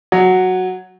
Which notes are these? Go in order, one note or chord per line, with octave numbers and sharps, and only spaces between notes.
F#3